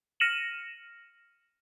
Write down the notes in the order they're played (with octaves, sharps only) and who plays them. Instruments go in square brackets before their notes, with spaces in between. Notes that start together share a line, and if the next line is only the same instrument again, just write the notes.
[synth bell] F6 A#6 C#7 D#7 E7 F#7